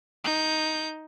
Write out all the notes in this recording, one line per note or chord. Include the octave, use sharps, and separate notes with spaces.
D#4 G6